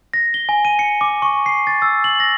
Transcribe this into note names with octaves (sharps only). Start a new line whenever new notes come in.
A#6
G7
G#5
D#7
C#7
D6
C#6
C7
A6
E6
F#7
A#6